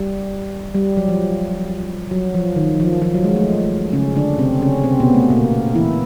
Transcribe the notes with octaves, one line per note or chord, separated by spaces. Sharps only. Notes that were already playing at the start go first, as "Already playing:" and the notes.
Already playing: G3
G3
F#3
F3
F#3
F3
D#3
F3
F3
F#3
G#3
A3
C#3 C#4
D3 D4
C3 C4
C#3 C#4
C3 C4
B2 B3
A3
A#2 A#3
E3 E4